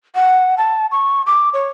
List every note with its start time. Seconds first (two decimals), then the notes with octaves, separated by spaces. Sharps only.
0.15 F#5
0.58 A5
0.91 C#6
1.26 D6
1.53 C#5